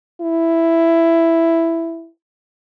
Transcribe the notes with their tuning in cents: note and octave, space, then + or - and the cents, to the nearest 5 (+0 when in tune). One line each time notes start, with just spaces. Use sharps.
E4 +5